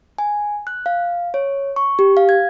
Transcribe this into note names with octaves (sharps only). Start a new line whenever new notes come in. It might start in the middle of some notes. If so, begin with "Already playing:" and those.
G#5
F#6
F5
C#5
C#6
G4
F5
G#6